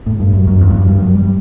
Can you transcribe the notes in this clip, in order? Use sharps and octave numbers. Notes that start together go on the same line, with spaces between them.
A2
G2
F#2
F#2
E2
G2
F#2
G2
F#3
G3